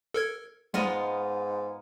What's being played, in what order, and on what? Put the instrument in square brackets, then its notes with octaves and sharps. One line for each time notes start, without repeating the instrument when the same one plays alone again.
[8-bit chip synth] A4 A#4 G#6
[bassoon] G#2 [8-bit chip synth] G3 G#3 [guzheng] B3 F4 D#5